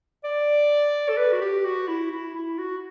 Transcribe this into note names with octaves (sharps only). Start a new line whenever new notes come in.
D5
A4
B4
F#4
G4
F#4
E4
E4
E4
F#4